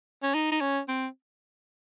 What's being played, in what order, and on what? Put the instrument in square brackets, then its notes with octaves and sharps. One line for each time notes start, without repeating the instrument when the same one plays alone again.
[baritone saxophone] C#4
D#4
D#4
C#4
C4